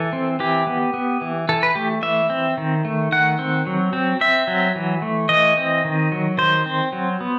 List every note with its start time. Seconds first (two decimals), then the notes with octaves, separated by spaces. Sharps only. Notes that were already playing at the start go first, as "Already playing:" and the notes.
Already playing: E3 A4
0.13 C4
0.40 E3 G4
0.67 B3
0.94 B3
1.21 E3
1.49 E3 A4
1.63 B4
1.75 A3 G4
2.02 E3 E5
2.30 C4
2.58 D#3
2.85 A3
3.12 D#3 F#5
3.39 C4
3.66 F#3
3.93 C4
4.21 C4 E5
4.47 F#3
4.75 E3
5.02 A3
5.29 E3 D#5
5.57 C4
5.85 D#3
6.12 F#3
6.38 D#3 C5
6.66 C4
6.92 F#3
7.20 B3